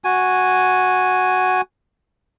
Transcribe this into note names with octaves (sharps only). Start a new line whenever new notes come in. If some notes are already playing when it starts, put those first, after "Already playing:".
F#4 G#5